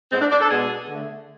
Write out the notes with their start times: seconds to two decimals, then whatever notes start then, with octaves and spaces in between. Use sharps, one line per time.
0.11 A2 G#3 B3 C4
0.20 D4
0.30 D4
0.40 A4
0.49 B2 G#3 B3 G#4
0.88 D3 A3